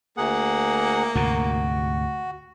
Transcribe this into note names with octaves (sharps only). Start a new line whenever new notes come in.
D2 A#3 G#4 F#5
D2 G#2 C3 F#4